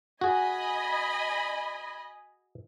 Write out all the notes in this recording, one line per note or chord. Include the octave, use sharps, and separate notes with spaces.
F#4 G#4 D#5 G#5 B5